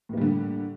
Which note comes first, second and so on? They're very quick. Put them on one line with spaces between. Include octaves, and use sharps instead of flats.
A2 A#3 G3 D3